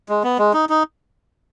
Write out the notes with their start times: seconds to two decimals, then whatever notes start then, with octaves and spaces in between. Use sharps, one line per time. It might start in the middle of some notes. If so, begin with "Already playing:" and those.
0.09 G#3
0.24 B3
0.39 G#3
0.53 D#4
0.69 D#4